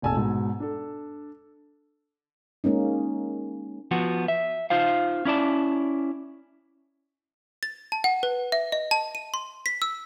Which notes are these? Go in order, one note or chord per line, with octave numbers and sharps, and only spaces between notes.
F1 A#1 G#5 A5 E6
G#2 B2
D4 A4
G#3 A#3 C#4 D#4
F3 B3 F#4
E5
D#4 F4 C5 F5
C#4 E4 D5 A5
A6
A5
F#5
B4
E5
D#5
A5
D#7
C6
B6
E6